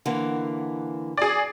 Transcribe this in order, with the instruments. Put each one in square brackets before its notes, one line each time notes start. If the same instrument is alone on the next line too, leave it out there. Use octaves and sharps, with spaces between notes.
[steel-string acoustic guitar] D3 E3 A#3
[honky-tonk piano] G#4 D5